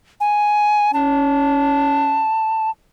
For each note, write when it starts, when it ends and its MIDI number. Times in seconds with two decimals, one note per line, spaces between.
0.20 0.92 80
0.94 2.27 61
0.94 2.70 81